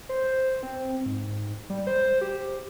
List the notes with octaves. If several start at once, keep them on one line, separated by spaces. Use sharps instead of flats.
C5
C4
G#2
G3
C5
G4